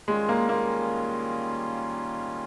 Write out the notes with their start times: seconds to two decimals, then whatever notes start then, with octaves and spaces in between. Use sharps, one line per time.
0.08 D#3 G3 G#3 C#4 F4
0.29 A#3
0.49 A#3